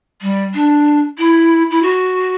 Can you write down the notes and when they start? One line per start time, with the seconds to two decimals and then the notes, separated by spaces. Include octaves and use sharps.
0.21 G3
0.54 D4
1.18 E4
1.71 E4
1.82 F#4